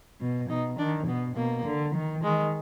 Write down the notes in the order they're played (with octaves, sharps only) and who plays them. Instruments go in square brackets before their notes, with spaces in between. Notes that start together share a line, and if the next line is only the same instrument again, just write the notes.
[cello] B2
[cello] B2 [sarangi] D#4
[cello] D#3 [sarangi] D4
[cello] B2 [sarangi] B3
[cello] B2 [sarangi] A#3
[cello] D3
D#3
[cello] D#3 [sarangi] G#3